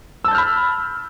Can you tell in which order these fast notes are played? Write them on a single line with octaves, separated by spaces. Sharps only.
E6 A5 G6 F6 B5